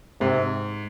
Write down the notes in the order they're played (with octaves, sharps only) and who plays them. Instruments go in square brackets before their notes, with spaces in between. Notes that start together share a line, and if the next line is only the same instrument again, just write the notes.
[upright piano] G#2 [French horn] C3